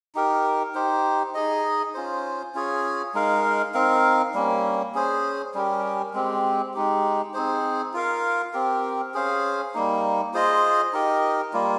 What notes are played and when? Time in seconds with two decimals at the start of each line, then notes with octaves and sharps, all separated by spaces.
0.15 D#4 G4 A#4
0.74 D#4 G4 C5
1.34 D#4 G#4 D#5
1.94 C#4 F4 C5
2.54 C#4 F4 G#4 C#5
3.14 G#3 D#4 A#4 F5
3.74 C4 D#4 A#4 F5
4.34 G3 A#3 C#4
4.94 C#4 G#4 C5
5.54 G3 C#4 G4 A#4
6.14 G#3 C4 G4
6.74 G#3 D#4 G4
7.34 C4 D#4 G#4 C5
7.94 F4 A#4 F5
8.53 C4 G4 A#4
9.14 C#4 G#4 C5 F5
9.74 G3 A#3 D#4
10.34 F4 G#4 C5 D#5
10.93 D#4 G4 A#4 D#5
11.53 G3 A#3 F4